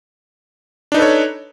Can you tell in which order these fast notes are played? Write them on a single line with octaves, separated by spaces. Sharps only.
D4 D#4 B4 A4 C#5